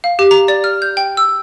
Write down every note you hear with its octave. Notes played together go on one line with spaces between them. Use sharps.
F5
G4
A#5
D5
F6
G6
G5
E6